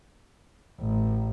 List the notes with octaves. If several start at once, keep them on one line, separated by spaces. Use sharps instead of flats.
A1